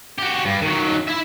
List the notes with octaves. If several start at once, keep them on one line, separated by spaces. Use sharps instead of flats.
F#4 G4
G2
D#3 F#3
E4 E5